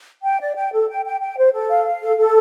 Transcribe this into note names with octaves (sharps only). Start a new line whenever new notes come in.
G5
D5
G5
A4
G5
G5
G5
C5
A4
F5
F5
A4
A4